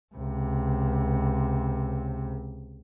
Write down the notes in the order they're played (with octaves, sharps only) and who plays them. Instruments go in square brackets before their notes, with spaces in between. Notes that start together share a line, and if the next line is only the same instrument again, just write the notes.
[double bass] C#2 C3